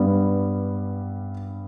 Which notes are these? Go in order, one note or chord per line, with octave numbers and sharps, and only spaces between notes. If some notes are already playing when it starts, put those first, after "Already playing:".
Already playing: G2 G3 B3